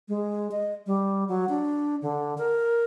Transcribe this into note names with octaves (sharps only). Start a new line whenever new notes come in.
G#3
D#5
G3
F#3
D4
D3
A#4